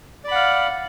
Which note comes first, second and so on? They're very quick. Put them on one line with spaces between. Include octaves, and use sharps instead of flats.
D5 B5 F#5 F5